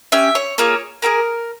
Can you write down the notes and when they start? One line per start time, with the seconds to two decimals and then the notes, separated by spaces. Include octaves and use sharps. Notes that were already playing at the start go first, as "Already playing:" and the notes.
0.12 C#4 G4 E5
0.35 C#5
0.58 A#3 F4 G#4 C#5
1.02 A#3 F4 G#4 A#4